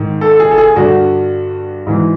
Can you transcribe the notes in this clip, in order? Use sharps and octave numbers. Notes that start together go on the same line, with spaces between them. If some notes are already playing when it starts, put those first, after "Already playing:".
Already playing: G#2 D#3
A4
G#4
A4
G#4
G2 D3 F#4
G#2 E3